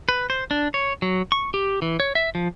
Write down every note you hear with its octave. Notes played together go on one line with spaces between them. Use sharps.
B4
C5
D4
C#5
F#3
C#6
G4
E3
C#5
E5
F3